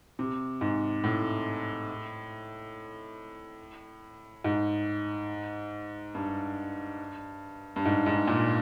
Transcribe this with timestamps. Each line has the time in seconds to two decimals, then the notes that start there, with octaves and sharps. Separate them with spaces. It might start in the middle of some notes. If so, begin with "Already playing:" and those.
0.19 C3
0.61 G#2
1.04 A2
4.44 G#2
6.15 G2
7.76 G2
7.86 G#2
8.06 G#2
8.28 A#2